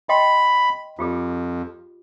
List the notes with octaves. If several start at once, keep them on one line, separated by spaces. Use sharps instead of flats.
D#5 G5 B5 C6
F2 F4 G4 G#4